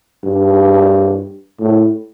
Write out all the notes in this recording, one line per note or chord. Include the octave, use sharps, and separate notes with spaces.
G2
A2